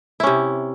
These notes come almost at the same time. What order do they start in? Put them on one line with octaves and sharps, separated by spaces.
E4 C#4 C3